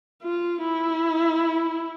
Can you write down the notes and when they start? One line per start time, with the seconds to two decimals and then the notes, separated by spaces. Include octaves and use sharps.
0.23 F4
0.62 E4